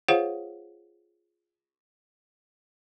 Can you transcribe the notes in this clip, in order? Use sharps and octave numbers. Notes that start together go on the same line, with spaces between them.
F4 G#4 C5 C#5 F5 F#5